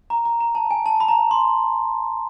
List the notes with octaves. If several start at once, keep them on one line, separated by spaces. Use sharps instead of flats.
A#5
A#5
A#5
A5
G#5
A5
B5
A#5
C6